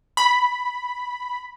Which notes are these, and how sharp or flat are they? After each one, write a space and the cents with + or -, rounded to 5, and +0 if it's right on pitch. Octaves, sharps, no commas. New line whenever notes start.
B5 +0